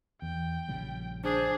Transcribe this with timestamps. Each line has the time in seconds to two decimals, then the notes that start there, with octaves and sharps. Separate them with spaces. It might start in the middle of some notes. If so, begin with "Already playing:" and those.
0.22 E2 G5
0.69 A#1 C#3 G3
1.24 D4 G#4 C5